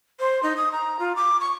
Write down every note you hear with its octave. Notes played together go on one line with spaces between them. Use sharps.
C5
D#4
D#6
A#5
F4
D6
C#6